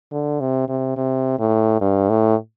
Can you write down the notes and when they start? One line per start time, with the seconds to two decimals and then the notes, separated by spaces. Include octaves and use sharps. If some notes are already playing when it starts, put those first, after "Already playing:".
0.12 D3
0.40 C3
0.68 C3
0.96 C3
1.39 A2
1.81 G2
2.09 A2